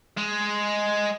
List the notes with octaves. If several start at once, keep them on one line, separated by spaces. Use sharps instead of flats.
G#3